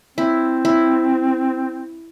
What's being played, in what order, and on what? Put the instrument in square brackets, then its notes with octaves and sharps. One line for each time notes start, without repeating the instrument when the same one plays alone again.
[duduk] C4 [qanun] E4
[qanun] E4